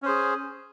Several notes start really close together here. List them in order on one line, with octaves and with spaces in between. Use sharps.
C#4 C5 G#4